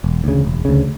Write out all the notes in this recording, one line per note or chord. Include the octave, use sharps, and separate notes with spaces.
E1
D2 C#3
E1
D2 C#3